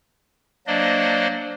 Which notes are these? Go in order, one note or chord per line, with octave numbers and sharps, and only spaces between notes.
F#3 A#3 D4 C5 D5 D#5